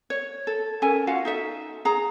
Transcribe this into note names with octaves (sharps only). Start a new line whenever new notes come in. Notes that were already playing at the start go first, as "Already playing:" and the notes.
C#5
A4
C#4 A4 A#4 G#5
F4 F#4 F5 F#5
D#4 A4 E5
G#4 A#5